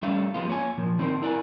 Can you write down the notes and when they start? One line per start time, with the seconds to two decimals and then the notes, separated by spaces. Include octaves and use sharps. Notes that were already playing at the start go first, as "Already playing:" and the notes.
0.03 G3 A3 C#4 D4 E5 F5
0.34 F3 G#3 B3 F4
0.48 A#3 C#5 G#5
0.78 A#2 F3
0.98 D#3 C4 D4 D#4 A#4 C5
1.22 E4 A#4 D5 F#5 G#5